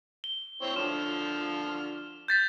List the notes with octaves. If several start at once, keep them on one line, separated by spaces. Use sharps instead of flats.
G7
C4 E4 C#5
D3 F3 F6 E7
G6 A6 B6